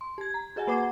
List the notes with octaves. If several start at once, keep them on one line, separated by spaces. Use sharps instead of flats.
C6
G4 G#6
A#5
F#4 G#4 D#5 F#5 G#5
A#3 B4 F#5 D6 G#6 C7